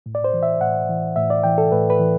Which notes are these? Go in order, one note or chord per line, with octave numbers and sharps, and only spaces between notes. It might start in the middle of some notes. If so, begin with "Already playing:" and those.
A2
D5
C5
E3
E5
A2 F#5
E3
A2 E5
D5
E3 G5
A4
A2 B4
B4
E3